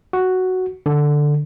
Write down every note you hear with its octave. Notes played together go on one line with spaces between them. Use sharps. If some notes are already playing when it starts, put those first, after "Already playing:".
F#4
D3